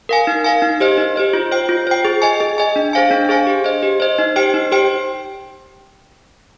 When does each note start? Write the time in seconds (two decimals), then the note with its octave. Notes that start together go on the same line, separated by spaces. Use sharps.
0.09 A#4 F5 G#5
0.27 D#4
0.44 A#4 F5 G#5
0.62 D#4
0.80 G4 C5 D#5
0.98 D#4
1.16 G4 C5 D#5
1.33 F4
1.51 C5 G5
1.69 F4
1.87 C5 G5
2.05 G#4
2.22 D#5 G#5
2.40 G#4
2.58 D#5 G#5
2.76 D4
2.93 G#4 C5 F5 G#5
3.11 D4
3.29 G#4 C5 F5 G#5
3.47 G4
3.64 C5 D#5
3.82 G4
4.00 C5 D#5
4.18 D#4
4.36 G4 C5 G5
4.54 D#4
4.72 G4 C5 G5